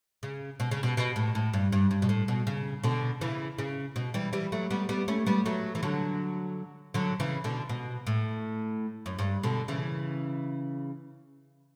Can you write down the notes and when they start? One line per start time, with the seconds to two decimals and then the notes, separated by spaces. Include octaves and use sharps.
0.23 C#3
0.60 B2
0.71 C#3
0.83 B2
0.97 B2
1.16 A2
1.35 A2
1.53 G2
1.72 G2
1.91 G2
2.02 B2
2.09 A2
2.28 B2
2.47 C#3
2.83 B2 D3
3.21 C#3 E3
3.58 C#3
3.96 B2
4.14 E3 G3
4.33 E3 G3
4.52 F#3 A3
4.71 G3 B3
4.89 G3 B3
5.08 A3 C#4
5.26 G3 B3
5.46 F#3 A3
5.75 E3
5.83 D3 F#3
6.94 D3 F#3
7.20 C#3 E3
7.44 B2 D3
7.69 B2
8.07 A2
9.06 F#2
9.19 G2
9.43 B2 D3
9.68 C#3 E3